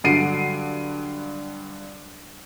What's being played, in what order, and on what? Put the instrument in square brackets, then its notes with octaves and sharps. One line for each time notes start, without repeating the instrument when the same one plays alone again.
[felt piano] G2 D3 F#3 C7 D7 D#7